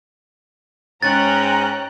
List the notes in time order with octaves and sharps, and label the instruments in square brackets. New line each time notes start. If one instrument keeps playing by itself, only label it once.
[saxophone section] G#2 C#4 [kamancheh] G5 A#5 [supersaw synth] F#6 [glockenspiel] A6